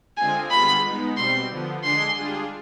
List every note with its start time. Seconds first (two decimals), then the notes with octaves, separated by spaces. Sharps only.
0.17 D3 G#3 C4 F4 G#4 G#5
0.51 D3 G3 B3 F4 G#4 B5
0.84 G#3 B3 D#4
1.17 B2 G3 C4 C6
1.50 D3 F3 B3
1.84 D3 G#3 D4 G#4 C6
2.17 G3 D4 F4 G#4